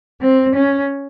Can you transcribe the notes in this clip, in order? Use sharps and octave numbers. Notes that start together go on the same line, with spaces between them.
C4
C#4